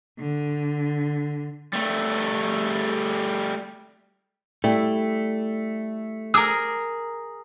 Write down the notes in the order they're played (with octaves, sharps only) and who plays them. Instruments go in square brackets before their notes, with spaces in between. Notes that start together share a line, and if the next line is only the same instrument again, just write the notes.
[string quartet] D3
[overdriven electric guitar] G3 A3
[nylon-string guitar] G3 E4 D5 [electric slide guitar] A3
[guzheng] G#4 A#4 [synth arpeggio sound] D6 D#6